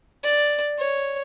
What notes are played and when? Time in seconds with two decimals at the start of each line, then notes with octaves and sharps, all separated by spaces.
0.23 D5
0.79 C#5